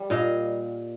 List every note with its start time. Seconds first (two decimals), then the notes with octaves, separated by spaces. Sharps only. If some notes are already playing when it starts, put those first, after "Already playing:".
Already playing: G3
0.10 A#2 D#5 F5